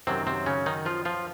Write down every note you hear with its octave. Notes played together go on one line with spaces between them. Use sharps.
F#2 C3 D#3 F#3 C4
C3 C4
C#3 C#4
D#3 D#4
F3 F4
F3 F4